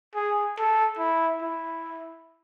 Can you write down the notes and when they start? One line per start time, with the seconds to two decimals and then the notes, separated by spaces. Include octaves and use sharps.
0.15 G#4
0.58 A4
0.99 E4
1.42 E4